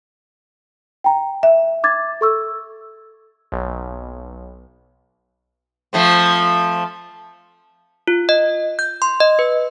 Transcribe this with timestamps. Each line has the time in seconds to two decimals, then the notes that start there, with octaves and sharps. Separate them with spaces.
1.04 G5 A#5
1.43 E5
1.84 D6 G#6 A6
2.21 A4 C#6 E6
3.52 B1
5.93 F3 A3 C4
8.07 F4
8.29 D#5
8.79 G6
9.02 C6
9.20 D#5
9.39 B4